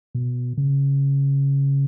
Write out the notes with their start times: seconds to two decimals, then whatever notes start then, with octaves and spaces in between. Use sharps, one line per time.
0.15 B2
0.57 C#3